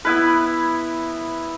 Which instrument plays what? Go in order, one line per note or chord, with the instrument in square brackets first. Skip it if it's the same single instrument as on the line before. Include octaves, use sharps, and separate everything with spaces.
[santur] B3 E4 B4